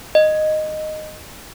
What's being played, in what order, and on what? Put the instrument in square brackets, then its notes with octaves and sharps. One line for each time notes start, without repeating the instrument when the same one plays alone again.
[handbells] D#5